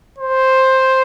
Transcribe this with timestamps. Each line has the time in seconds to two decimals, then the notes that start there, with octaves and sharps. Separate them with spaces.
0.18 C5